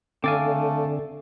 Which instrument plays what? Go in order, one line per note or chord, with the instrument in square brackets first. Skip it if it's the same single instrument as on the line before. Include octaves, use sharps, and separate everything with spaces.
[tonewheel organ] D3 [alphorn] A3 [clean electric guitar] C4 A4 G#5 [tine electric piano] F5 D6